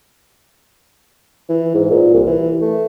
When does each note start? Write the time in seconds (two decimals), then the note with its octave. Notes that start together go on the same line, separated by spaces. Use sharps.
1.49 E3
1.75 G#2
1.91 A#2
2.14 C2
2.26 E3
2.62 A3